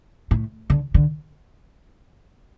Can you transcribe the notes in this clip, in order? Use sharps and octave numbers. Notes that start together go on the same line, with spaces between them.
A2
D3
D3